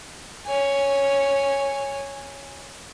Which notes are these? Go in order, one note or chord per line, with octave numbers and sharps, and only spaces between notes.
C#5 G#5